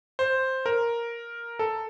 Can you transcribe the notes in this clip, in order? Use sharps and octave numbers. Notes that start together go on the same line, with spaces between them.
C5
A#4
A4